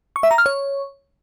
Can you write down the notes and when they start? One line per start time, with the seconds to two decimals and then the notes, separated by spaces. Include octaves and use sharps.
0.16 C#6
0.23 E5
0.31 A#5
0.38 F6
0.46 C#5